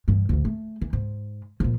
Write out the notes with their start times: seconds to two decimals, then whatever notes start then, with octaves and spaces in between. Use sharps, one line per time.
0.08 G2 E3
0.29 A1 D2
0.45 A3
0.81 E3
0.93 G#2
1.60 A#2 F3